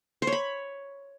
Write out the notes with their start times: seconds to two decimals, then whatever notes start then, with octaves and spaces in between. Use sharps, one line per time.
0.22 C5
0.27 C#5
0.32 B5